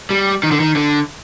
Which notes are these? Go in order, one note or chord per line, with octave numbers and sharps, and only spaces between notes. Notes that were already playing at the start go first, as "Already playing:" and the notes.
G3
D#3
D3
D#3
D3